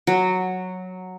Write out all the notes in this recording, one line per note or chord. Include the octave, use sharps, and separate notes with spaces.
F#3